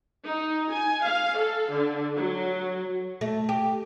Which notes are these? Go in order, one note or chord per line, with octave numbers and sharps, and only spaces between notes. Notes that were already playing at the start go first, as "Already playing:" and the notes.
D#4
G#5
F5
A4
D3
F#3
A3
G4